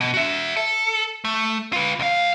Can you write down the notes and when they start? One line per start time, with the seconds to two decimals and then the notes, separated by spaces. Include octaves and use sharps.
0.01 B2
0.14 F#4 E5
0.57 A4
1.25 A3
1.73 F4 B4
2.00 C#2 F5